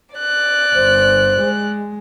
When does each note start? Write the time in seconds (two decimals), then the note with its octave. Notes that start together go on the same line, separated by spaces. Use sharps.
0.15 D5 F#6
0.75 G1 C5
1.41 G#3